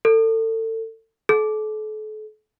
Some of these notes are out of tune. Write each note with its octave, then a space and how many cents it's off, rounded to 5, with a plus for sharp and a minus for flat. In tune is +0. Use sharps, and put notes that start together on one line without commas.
A4 +30
A4 -40